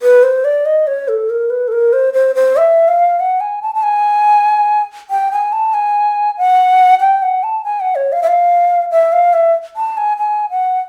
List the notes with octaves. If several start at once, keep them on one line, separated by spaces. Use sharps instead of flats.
B4
C5
D5
D#5
C#5
A4
A#4
B4
A4
A#4
C5
C5
C5
E5
F5
F#5
G#5
A5
A5
G#5
G5
G#5
A5
G#5
F#5
G5
F#5
A5
G#5
F#5
C#5
F5
E5
F5
E5
F5
E5
A5
G#5
G#5
F#5